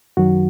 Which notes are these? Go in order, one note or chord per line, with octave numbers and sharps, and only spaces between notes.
F#2 D#3 F#3 F#4